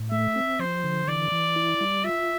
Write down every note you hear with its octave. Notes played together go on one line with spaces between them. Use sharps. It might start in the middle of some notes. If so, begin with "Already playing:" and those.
Already playing: A2
A3 E5
C4
F3 C5
D3
E3 D5
E3
E4
G3
F4 E5